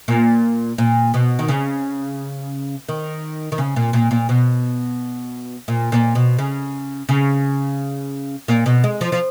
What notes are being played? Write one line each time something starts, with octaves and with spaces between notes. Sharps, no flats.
A#2
A#2
B2
D#3
C#3
D#3
D#3
C#3
A#2
A#2
A#2
B2
A#2
A#2
B2
C#3
C#3
A#2
B2
G#3
F3
F3